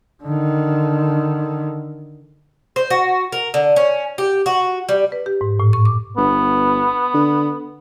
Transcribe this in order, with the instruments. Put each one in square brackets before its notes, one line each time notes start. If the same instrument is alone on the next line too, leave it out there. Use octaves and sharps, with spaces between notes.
[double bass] D3 D#3
[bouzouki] C5
F#4
A#4
D3
C#4
G4
F#4
G3
[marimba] B4
G4
G#2
A2
C#6
D6
[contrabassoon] G1 [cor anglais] B3
[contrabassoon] D3